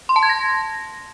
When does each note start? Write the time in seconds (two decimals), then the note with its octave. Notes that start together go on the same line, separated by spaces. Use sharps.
0.09 C6
0.16 A5
0.23 G#6
0.29 A#6